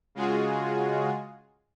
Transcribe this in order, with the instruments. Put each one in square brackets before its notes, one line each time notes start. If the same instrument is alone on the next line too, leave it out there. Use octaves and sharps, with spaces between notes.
[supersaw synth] C#3 G#3 F4 F#4 G#4